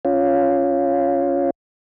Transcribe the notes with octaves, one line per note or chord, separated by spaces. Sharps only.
C#4 F4